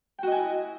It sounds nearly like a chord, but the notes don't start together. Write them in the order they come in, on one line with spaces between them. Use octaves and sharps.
G5 F#4 D#5 G#5 E4